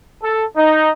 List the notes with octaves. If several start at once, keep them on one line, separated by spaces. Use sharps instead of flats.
A4
D#4